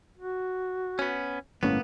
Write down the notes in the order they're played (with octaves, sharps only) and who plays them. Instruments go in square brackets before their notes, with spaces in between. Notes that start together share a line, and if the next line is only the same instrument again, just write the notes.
[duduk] F#4
[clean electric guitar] B3 C#4
[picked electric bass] G1 A2 C#4 [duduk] A#3 [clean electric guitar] B3